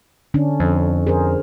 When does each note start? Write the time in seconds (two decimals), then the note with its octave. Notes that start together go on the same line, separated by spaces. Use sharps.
0.34 D3 C#4 D4
0.60 F2
1.07 G#4 A#4 C5